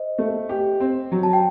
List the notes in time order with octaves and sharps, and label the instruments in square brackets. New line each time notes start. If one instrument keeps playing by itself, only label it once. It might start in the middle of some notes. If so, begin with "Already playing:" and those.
Already playing: [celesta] C5 D#5
[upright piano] A3
G4
C4
F#3
[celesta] A5
G5